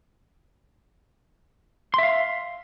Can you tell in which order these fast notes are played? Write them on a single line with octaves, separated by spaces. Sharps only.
C6 E5 F5